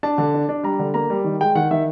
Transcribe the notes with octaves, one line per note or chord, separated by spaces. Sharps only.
D4 A5
D3
D4
D4
G3 A#5
D3
A#3 A#5
G3
D#3
G#3 G5
D#3 F#5
D#3 E5